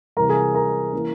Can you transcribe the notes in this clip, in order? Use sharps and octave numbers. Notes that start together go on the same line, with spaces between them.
C3 E3 G3 A#4 A#5
G#4 G#5
A#4 A#5
E3 A#3 C#4